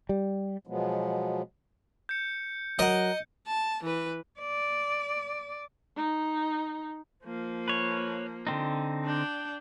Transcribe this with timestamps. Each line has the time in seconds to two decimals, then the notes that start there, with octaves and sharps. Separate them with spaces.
0.09 G3
0.67 B2 F3 F#3 G#3 B3
2.09 G6 C#7
2.79 F#3 A#4 D#5 F#5
3.47 A5
3.83 E3 B4
4.40 D5
5.97 D#4
7.24 F3 A#3
7.68 B4 C#5
8.47 D3 C4 D#4
9.05 D4 G5